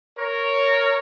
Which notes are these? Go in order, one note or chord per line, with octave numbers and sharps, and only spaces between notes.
A#4 C#5